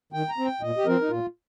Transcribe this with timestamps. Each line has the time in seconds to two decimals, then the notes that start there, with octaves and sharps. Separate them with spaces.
0.13 D#3 G5
0.29 A#5
0.38 C4
0.45 G5
0.61 A#2 D#5
0.77 G4
0.85 F3 C4 A#4
1.01 D#4
1.09 A#2 F4